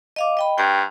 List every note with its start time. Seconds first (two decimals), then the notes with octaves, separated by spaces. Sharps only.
0.16 D#5 F5 D6
0.37 D#5 G5 B5
0.58 G2 G5